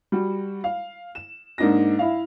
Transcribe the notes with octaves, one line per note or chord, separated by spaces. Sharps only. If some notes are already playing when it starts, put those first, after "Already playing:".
G3 F#4
F5
E7
G#2 A#3 D4 D#4 A#6
E4 E5 F5